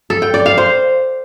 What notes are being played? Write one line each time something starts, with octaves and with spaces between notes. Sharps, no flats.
A4
G5
D5
F5
C5